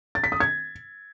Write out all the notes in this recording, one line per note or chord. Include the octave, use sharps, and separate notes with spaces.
A6
B6
D#6
G#6